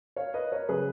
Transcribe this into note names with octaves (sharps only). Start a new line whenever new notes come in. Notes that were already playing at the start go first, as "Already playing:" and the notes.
C#5 F5
B4 D#5
A#4 C#5
C#3 F#3 G#4 B4